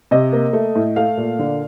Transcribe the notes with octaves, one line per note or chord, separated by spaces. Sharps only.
C3 D#5
A#3
A3
A2
A3 F5
A#2
D3